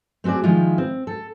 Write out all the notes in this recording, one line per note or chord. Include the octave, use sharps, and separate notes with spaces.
A3 C4 F#4 G#4 D5
D#3 F3 G#3 E4 F4
C4
A4